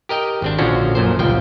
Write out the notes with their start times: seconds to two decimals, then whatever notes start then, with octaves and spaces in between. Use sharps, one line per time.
0.09 G4 A#4 D#5 G5
0.42 G#1 C4 D4
0.59 A#1 D3 F3 C#4 F#4
0.95 F#2 A#2 C5
1.19 G1 C#2 F3 G5